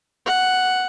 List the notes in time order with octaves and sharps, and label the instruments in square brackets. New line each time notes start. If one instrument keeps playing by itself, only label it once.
[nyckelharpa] F#5